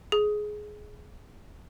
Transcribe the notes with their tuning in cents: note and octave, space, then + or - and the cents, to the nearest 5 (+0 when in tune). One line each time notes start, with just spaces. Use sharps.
G#4 +15